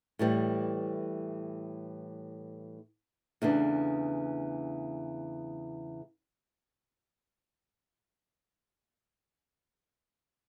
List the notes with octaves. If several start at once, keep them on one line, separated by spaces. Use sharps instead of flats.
A2 E3 G3
E2 C#3 E3 A3 D4